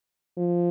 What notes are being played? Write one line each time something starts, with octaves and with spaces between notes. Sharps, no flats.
F3